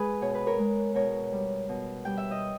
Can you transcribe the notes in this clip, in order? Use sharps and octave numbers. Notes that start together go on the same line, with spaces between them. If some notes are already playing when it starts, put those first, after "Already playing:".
Already playing: G#3 G#4 B4
B2 C#5
B4
A#4 C#5
G#3
B2 A#4 C#5
G3
B2
G3 G5
E5
D#5